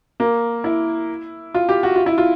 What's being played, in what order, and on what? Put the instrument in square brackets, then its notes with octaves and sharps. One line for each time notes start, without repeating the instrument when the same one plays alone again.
[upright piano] A#3
E4
F4
G4
F#4
F4
E4
F4